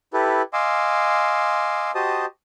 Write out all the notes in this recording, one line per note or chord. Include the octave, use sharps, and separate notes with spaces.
E4 G4 A4 B4
D#5 F5 G#5 C6 D6 E6
F#4 G4 C5 D#5 A5 D#6